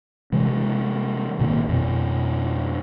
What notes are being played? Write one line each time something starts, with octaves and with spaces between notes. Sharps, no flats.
C3 E3 G#3
A1 B2 D#3 A#3
F2 B2